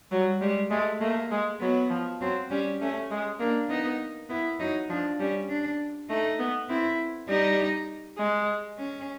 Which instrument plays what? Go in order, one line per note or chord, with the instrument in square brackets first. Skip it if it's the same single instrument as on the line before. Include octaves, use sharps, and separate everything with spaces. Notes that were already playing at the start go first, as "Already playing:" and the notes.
[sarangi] F#3 [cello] G3
[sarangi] G3 [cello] G#3
[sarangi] G#3 [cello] A3
[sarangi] A3 [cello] A#3
[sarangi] G#3
[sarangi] F#3 [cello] B3
[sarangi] F3
[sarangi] F#3 [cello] C4
[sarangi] G3 [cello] C#4
[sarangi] A3 [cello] C#4
[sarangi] G#3
[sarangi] A#3 [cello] D4
[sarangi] B3 [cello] D#4
[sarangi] B3 [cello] E4
[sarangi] F#3 [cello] D#4
[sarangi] F3 [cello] D4
[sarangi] G3 [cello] C#4
[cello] D4
[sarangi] A3 [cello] D#4
[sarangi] B3
[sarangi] C4 [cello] E4
[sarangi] G3 [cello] D#4
[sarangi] G#3
[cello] C#4